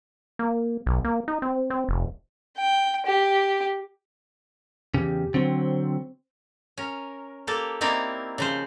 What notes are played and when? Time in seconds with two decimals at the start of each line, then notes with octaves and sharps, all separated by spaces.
0.39 A#3
0.86 B1
1.05 A#3
1.28 D#4
1.42 C4
1.70 C4
1.89 F1
2.58 G5
3.07 G4
4.94 E2 C#3 G4
5.34 D3 F#3 C4
6.78 C#4 A#4
7.47 A#3 G4 A4 A#4
7.81 A#3 C4 D#4 E4 A#4 D5
8.38 C#3 F3 C5